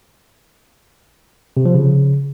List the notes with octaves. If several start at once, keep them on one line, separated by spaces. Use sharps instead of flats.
C3
F3
C#3